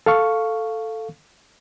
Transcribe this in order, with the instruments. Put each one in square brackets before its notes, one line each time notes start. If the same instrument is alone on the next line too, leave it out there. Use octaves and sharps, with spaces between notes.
[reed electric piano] A4 F5 C#6